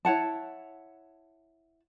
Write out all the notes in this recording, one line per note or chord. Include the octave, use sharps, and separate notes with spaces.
E4 C#5 F#5 A5